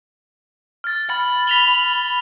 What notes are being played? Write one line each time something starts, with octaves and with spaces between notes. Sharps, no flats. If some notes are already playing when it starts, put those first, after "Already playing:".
F6 A6
B5 A6
B6 F7 G7